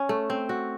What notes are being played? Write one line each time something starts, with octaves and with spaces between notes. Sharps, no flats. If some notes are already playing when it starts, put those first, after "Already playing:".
Already playing: C#4
A3
C4
F#4